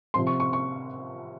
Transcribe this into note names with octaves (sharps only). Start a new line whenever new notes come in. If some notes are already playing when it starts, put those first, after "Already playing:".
C3 F3 C4 C6
C#6
C#6
C#6